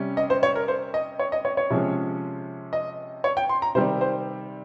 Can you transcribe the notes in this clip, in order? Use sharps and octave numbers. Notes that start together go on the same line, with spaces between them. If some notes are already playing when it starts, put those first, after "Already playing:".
Already playing: C3 G3 C#4
D#5
C5
C#5
A#4
C5
D#5
C#5
D#5
C#5
C#5
C3 F3 G#3 C#4
D#5
C#5
G5
C6
A#5
C3 D#3 G3 C4 C5
C5